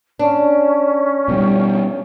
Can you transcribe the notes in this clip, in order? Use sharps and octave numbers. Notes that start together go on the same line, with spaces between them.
C#4 D4
B2 G3